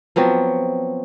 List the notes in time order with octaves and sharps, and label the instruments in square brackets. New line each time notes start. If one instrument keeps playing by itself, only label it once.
[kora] F3 F#3 B3 C4